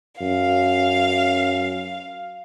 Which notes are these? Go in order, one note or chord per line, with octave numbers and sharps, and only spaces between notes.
F#2 F5